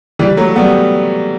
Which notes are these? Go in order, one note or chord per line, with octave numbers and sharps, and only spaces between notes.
E3 G3
F#3 A3
G3 B3